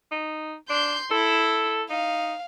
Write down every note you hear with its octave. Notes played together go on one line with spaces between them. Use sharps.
D#4
D4 C6 G6
E4 A4
D#4 F5